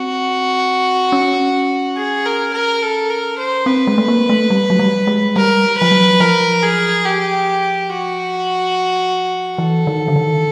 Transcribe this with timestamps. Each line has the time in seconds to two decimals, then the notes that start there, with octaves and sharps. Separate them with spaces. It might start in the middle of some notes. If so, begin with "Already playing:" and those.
Already playing: C4 F#4
1.12 C#4
1.97 G#4
2.26 A#4
2.54 A#4
2.82 A4
3.10 A#4
3.38 C5
3.66 C4 B4
3.87 G#3
3.98 A3
4.08 A#3
4.29 A3
4.50 G3
4.70 F#3
4.79 G3
5.07 G#3
5.36 G3 A#4
5.78 F3 B4
5.92 F#3
6.20 F3 A#4
6.62 G#4
7.05 G4
7.89 F#4
9.58 E3 A4
9.87 D#3
10.08 D3
10.16 D#3